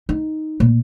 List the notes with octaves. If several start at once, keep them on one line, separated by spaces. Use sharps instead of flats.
D#4
A#2